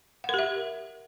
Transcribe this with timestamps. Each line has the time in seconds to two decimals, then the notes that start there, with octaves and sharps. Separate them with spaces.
0.24 F#5
0.29 A#4
0.34 G4
0.39 E5